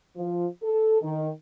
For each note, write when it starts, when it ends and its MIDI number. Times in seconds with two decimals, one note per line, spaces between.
0.17 0.47 53
0.63 1.00 69
1.02 1.30 51